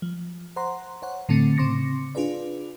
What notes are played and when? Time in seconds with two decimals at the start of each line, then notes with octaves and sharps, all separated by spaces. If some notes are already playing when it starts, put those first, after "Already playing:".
0.02 F3
0.56 C5 F#5 A#5 C6
1.02 C5 C#5 F#5
1.29 A2 D3 A3 C4 A6 C#7
1.57 C#3 C4 C6 D6 A#6 C#7
2.15 D4 F4 G#4 B4 D5